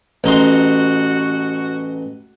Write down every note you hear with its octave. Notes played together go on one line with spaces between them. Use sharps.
A1 D#4 F#4 C6